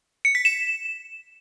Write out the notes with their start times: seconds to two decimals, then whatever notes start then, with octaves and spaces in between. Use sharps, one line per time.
0.25 C#7
0.35 B6
0.45 E7